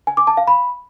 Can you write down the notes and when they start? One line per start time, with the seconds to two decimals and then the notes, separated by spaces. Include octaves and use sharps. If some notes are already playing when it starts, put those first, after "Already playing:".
0.07 G#5
0.17 D6
0.27 A5
0.37 F5
0.47 B5